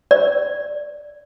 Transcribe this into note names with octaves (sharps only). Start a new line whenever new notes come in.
D5